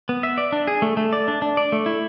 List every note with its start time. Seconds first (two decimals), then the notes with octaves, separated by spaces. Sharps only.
0.09 B3
0.23 E5
0.38 D5
0.52 D4
0.67 G#4
0.82 A3
0.97 A3
1.13 D5
1.28 D4
1.42 D4
1.57 D5
1.72 A3
1.86 E4